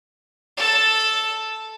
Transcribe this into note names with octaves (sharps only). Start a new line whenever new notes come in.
A4 A5